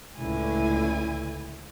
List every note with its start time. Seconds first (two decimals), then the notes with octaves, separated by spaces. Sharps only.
0.18 C#2 A2 D3 E4 G#5